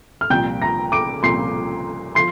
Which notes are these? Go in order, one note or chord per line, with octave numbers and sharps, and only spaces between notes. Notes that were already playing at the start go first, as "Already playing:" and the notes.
F6
C2 A#2 F3 G5 G6
A#5 A#6
D6 D7
C2 A#2 F3 C6 C7
F3 C6 C7